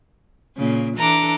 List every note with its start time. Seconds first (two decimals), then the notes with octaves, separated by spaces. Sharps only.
0.57 A#2 C#3 A#3
0.97 E3 D4 A4 A#5 D6